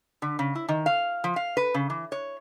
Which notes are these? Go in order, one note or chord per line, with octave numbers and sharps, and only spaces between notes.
D3
C#3
E4
D#3
F5
F3
F5
B4
C#3
E3
C#5